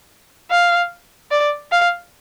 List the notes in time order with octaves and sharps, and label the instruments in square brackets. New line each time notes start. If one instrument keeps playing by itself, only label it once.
[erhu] F5
D5
F5